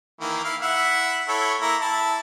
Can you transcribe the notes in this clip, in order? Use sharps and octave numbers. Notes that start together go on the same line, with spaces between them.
D#3 E3 A#3
E4 F5
E4 E5 F#5
E4 A4 C#5
A#3 E4 A#5
E4 A5